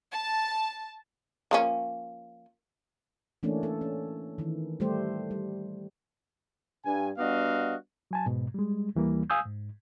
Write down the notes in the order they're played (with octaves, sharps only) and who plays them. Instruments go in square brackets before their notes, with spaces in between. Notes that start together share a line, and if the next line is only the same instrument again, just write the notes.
[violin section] A5
[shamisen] F3 A#3 C#4
[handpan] E3 A3 A#3 C#4 D4
A4
C#4
D#3 E3
G3 A3 G4 C5
G3
[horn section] G2 G#5
G3 B3 D4 F#4 D#5 F5
[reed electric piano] F#3 G#5 A5
G#2 B2
G3 G#3
D#2 E3 G3 A#3
F5 G#5 D#6 E6 G6
G#2